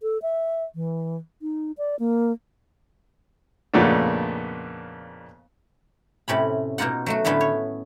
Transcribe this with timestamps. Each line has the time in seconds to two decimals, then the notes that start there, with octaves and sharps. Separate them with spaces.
0.02 A4
0.22 E5
0.75 E3
1.42 D#4
1.78 D5
1.99 A#3
3.73 F2 A#2 C#3 A3 B3 D4
6.28 A2 C3 C#4 B5
6.78 B2 A#3 D#4 F4 F#5
7.06 F#3 A3 F#4
7.25 A2 D3 A3 B3 C#4 E4
7.41 C#5